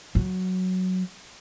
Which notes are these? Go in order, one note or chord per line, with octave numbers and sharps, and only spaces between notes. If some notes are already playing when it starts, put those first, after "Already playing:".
F#3